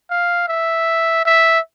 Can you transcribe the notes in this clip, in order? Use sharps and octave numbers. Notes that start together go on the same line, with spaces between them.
F5
E5
E5